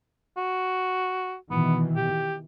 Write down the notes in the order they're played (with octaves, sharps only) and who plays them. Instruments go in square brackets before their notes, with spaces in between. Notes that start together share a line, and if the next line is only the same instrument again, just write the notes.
[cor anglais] F#4
[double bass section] B2 D#3 E3 [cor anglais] B3
[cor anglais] G4